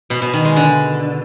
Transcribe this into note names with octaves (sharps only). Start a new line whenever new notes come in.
B2
B2
D#3
G#3
D3